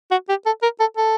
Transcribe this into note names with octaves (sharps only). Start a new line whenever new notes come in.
F#4
G4
A4
A#4
A4
A4